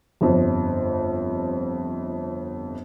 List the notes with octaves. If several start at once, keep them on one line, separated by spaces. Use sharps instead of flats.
G1 F2